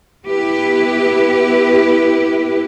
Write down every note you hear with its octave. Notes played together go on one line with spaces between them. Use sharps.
B3 E4 G4 B4